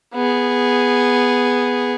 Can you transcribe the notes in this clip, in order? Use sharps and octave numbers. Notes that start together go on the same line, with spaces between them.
B3 G#4